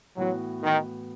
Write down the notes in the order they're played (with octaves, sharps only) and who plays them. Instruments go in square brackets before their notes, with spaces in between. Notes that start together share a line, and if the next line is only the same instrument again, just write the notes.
[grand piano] A2 E3 B3 F#4 [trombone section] F#3
[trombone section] D#3